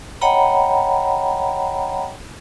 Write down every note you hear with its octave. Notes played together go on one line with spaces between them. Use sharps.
C#5 D#5 F#5 G5 A#5 B5